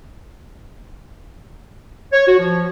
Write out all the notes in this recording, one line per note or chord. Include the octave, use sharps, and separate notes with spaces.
C#5
F#4
F3